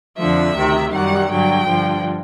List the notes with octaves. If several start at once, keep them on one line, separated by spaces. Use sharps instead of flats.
F2 D3 F3 E5
D2 C3 D#3
F#2 D#3 G3 F#5
G2 D3 F#3 G5
G2 D3 F3